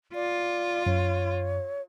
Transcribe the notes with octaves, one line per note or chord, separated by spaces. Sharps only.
F4 D5
F#2 C#5